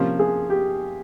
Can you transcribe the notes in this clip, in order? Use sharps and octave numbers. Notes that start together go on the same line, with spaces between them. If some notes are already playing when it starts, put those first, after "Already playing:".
Already playing: C3 F3 A#3 C#4
G#4
G4